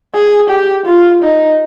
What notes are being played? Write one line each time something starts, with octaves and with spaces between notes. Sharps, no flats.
G#4
G4
F4
D#4